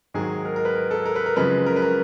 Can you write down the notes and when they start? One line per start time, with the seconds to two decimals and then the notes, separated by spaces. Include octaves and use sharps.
0.14 G#2 D#3 F#3 G#4
0.45 A#4
0.56 A#4
0.65 B4
0.75 A#4
0.91 A4
1.06 A#4
1.16 B4
1.26 A#4
1.36 F#2 C#3 F3 G#3 B4
1.66 A#4
1.76 B4
1.82 A#4